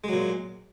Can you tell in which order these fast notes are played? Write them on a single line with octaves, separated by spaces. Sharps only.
G#3 F#3 A#2